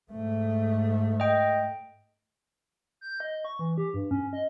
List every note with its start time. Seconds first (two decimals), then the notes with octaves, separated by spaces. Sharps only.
0.11 G#2 A3
1.20 D#5 G5
3.01 G6
3.20 D#5
3.44 C#6
3.59 E3
3.78 G4
3.94 G2
4.11 C#4
4.33 D#5